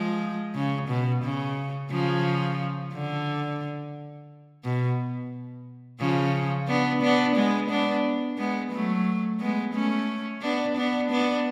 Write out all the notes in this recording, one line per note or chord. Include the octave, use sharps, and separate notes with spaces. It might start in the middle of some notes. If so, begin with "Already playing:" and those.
Already playing: F3 G#3
C#3
B2
C#3
C#3 F3
D3
B2
C#3 F3
B3 D4
B3 D4
G#3 B3
B3 D4
G#3 B3
F#3 A3
G#3 B3
A3 C#4
B3 D4
B3 D4
B3 D4